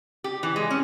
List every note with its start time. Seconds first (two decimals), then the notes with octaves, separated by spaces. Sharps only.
0.24 G4
0.43 E3
0.56 G#3
0.70 C#4